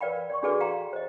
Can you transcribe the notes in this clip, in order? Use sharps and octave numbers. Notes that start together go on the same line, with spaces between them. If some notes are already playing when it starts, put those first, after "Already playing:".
A#4 B4 D5 F5 G5 B5
D5 C6 C#6
D4 F#4 G#4 A4 B4 D5
F5 G5 A#5 C6
C5 D#5